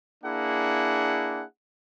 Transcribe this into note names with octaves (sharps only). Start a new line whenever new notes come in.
A#3 D4 E4 G#4 F#5